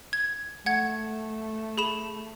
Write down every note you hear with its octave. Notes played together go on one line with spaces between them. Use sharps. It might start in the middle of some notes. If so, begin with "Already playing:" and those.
G#6
A3 F#5 G#6
G#4 B5 E7